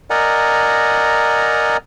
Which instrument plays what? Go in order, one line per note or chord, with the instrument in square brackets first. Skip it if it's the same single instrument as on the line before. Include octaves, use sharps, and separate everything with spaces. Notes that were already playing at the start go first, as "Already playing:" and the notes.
[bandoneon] A#4 D5 D#5 F#5 G#5 A#5